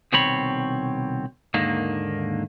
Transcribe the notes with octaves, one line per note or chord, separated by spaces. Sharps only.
C2 B2 D#3 C4 C#5 B5
D#2 G#2 D3 D#3 A#3